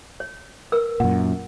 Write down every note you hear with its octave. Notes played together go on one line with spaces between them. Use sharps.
C#5
A#4 B4 E6
F#2 A#2 F#5